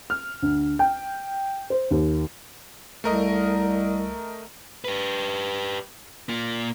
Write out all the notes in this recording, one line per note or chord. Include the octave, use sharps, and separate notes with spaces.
F6
D2
G5
C5
D#2
C2 A3 A#4 D#5
G4 B4
A#3 F4